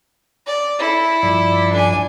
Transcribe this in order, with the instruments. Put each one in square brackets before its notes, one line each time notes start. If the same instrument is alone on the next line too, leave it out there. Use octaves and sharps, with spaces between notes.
[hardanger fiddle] D5
E4 A4
[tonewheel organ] G2 F3 D5
[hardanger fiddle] D4 G#5